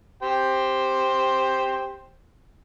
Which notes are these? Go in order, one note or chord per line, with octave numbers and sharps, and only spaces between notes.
G4 C5 G5